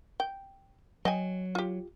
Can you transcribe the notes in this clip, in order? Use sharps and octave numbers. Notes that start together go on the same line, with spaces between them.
G5
F#3 D#5 G5 G#5
F4 G4